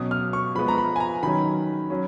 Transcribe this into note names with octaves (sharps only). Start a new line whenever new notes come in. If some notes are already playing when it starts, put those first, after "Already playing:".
Already playing: B2 F#3 C#4 D#6
F6
C#6
F3 G#3 B3 B5
A#5
B5
G#5
A#5
D#3 F#3 C#4 B5
F#3 C#4